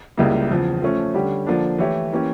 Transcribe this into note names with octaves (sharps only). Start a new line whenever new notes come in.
C#2 C#3 G3 A#3 E4
E2 C#3 F3
F3 A3 C#4
D3 G3 C#4 G4
D3 F3 A#3 D4
E3 A3 E4 G4 C#5
E3 A#3 C#4 G4